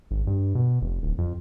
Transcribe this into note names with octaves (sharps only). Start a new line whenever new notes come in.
G#1
G2
B2
F1
D1
F2